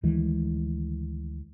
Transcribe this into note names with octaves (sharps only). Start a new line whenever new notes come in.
D2 D#3 E3 G#3